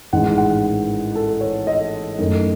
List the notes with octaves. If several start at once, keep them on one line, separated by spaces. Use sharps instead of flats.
A1 G#2 D#3 G#3 F#5
F#5
A4
C#5
D#5
F#2 D#3 A3